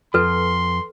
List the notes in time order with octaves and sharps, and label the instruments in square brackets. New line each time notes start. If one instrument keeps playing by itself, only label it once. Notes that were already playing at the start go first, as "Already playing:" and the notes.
[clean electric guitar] F2 [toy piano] A4 B4 [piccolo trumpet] C6